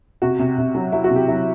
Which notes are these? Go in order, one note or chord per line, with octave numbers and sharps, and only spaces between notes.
C3 F#4
C3
C3
F#3
F#3 E4
F#4
C3
G4
F#3 E4